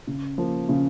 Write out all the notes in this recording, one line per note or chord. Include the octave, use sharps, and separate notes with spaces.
C#3
F3 A#3
C#3